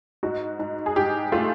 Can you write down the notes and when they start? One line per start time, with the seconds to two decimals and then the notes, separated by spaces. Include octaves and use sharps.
0.23 G#2 F#4
0.59 G#2
0.86 G#4
0.96 G#2 G4
1.32 A3 F4